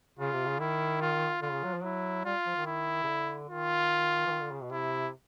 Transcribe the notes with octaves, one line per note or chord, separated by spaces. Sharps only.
C#3 F4
C3
C#3
D#3 E4
F4
D3 F4
C#3
F#3
F3
F#3 E4
G3 F4
F3
D#3
E4
C#3
D3
D#3 F4
E3
D#3
D3
C#3
B2
C3 E4